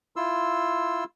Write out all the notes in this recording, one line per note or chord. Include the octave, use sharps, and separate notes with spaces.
E4 F4 C6 E6